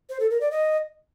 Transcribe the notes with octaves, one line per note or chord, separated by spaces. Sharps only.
C5
A4
A#4
D5
D#5